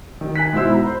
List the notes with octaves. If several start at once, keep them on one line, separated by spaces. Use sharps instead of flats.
D#3
G#5 F#6 B6
G#2 B2 E4 C5 E6
A#5 B5
C5